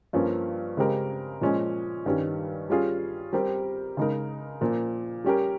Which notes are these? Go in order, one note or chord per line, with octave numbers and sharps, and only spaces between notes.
G2 F3 A#3 C#4
C#3 G#3 C4 G4 A#4
A#2 F3 G#3 C#4
G2 D#3 G3 C#4
G3 C#4 F4 G#4
G3 C4 G4 A#4
C#3 G#3 D#4 A#4
A#2 F3 A#3
G3 C#4 G4 A#4